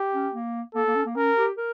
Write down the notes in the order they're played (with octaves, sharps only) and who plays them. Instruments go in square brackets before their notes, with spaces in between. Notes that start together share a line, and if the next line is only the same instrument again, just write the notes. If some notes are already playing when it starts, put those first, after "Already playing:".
Already playing: [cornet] G4
[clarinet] C#4
A#3
[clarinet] A#3 [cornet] A4
[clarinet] A#3
C#4
A#3
[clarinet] C#4 [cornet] A#4
[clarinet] G4
A#4